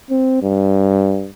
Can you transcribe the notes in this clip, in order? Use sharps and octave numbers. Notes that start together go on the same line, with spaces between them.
C4
G2